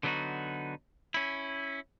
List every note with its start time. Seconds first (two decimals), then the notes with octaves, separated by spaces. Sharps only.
0.03 D3 F#3 B3 D4 D#4 F#4
1.14 C#4 E4